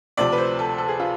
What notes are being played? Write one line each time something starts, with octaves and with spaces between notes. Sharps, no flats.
D2 C3 F3 D5
B4
C5
A4
A4
G#4
F4